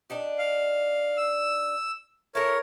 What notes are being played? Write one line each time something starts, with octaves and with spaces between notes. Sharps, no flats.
D4 D#4 G4
F5
E6
E4 A4 A#4 C#5